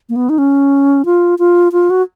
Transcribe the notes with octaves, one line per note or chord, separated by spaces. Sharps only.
A#3
B3
D#4
C#4
F4
F4
F4
F#4